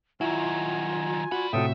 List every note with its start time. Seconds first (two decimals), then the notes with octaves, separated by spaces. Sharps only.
0.21 D#3 F#3 E4 F4 G#5
1.32 F4 F#4 D5 B5
1.53 A2 C3 F#4 A4 E5 G5 D#6